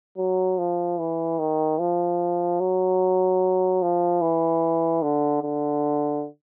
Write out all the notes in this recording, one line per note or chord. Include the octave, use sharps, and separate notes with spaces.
F#3
F3
E3
D#3
F3
F#3
F3
E3
D3
D3